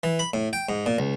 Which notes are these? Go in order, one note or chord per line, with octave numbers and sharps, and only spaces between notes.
E3
B5
A2
G5
G#2
A#2
C#2